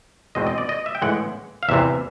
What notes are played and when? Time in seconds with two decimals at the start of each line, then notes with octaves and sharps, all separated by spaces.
0.35 E2 B2 G#3 C4 D#5
0.47 D#5
0.58 D5
0.69 D#5
0.86 E5
0.95 G5
1.02 A2 E3 G#3 F#5
1.63 F5
1.69 E2 C3 E3 E5